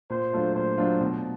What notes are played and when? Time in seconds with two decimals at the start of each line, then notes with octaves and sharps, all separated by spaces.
0.10 A#2 C5
0.33 F#3 A3 D4 F4
0.55 A#2 C5
0.78 F#3 A3 D4 F4
1.01 B2